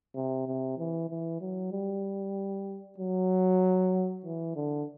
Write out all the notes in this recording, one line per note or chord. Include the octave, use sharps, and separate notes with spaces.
C3
C3
E3
E3
F#3
G3
F#3
E3
D3